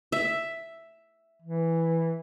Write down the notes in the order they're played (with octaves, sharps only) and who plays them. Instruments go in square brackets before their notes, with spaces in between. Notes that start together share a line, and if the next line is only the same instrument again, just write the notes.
[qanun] E5
[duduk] E3